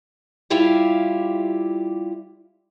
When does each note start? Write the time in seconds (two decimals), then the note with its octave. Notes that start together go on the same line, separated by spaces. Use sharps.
0.50 G3 E4 F4 G4 E5 F5